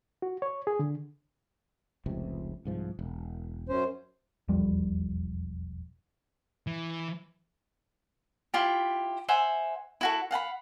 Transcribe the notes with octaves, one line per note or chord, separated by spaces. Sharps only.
F#4
C#5
G#4
D3
F1 C#2 C3
C2 G#2 F3
E1
F#2 C#4 C5
E1 B1 F2 G3
E3
E4 F4 G4
C5 E5 F#5 G#5
E4 F#4 A4
F5 F#5 A5 B5